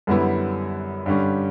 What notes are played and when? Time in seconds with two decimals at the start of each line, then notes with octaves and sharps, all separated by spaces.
0.07 F#2 D3 G3 B3 E4
1.06 G2 D3 G3 C#4